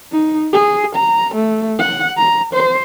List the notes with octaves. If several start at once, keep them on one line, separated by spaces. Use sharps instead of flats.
D#4
G#4
A#5
A3
F#5
A#5
C5